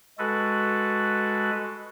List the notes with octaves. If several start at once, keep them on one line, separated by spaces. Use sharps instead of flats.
G#3 F#4 A4 B4